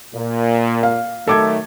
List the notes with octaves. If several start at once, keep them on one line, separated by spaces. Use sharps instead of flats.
A#2
F5
D#3 F#3 A3 A4 D6 G#6